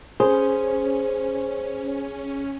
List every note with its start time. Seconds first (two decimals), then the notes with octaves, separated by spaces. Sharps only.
0.20 C#4 G#4 C5